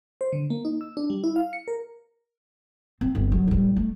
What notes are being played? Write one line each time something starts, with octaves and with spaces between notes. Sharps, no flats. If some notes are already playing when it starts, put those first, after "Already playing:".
C5
D3
A#3
D#4
E6
D4
G3
E4
F5
C#7
A#4
C4
G1
F#3
A2 G3
A3